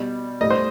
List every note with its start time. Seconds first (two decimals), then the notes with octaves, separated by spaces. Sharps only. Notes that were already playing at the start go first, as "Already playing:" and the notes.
Already playing: B2 G3
0.41 A2 G3 D#5
0.50 C5